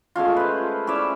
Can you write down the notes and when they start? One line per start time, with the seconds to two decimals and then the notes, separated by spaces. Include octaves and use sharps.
0.16 G#3 A3 C#4 F4
0.37 B4 C5
0.87 C#4 E4 D5 E5